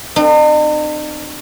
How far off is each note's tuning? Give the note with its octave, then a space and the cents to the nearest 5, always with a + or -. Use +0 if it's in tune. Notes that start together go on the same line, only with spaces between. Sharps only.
C4 +0 D#4 -45